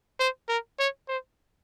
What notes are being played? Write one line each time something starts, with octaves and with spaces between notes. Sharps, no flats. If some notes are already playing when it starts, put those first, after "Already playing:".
C5
A#4
C#5
C5